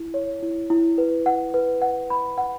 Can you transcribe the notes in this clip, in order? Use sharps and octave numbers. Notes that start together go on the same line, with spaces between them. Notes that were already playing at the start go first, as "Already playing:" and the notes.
Already playing: E4
C#5
E4
E4
B4
F#5
B4
F#5
B5
F#5